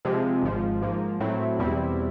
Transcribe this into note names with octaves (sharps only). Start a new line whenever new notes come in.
C3 F3 G#3
G#1 G#2 F3
G#2 F3 A#3
A2 F#3 A3 C4 E4
E2 B2 G3 C4 E4